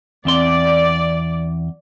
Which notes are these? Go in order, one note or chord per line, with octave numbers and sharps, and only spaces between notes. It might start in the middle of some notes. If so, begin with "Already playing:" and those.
E2 C4 D5 C6